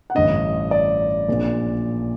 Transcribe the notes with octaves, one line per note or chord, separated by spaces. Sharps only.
F#5
A1 G2 D3 D#5
D5
A#1 A#2